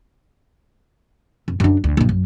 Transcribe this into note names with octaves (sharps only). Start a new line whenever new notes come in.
F2
F#2 D4
D2
A#1 G2
F#2